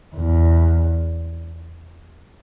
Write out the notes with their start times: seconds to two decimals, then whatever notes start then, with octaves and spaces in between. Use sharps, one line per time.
0.16 E2